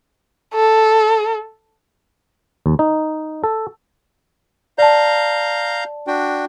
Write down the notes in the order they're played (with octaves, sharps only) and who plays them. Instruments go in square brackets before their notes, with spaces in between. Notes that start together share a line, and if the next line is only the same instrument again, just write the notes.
[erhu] A4
[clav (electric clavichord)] D#2
D#4
A4
[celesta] D5 A5 [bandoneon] F5 A#5 G6
[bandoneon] D4 F#4 G5